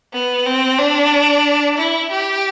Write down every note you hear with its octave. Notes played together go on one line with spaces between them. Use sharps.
B3
C4
D4
E4
G4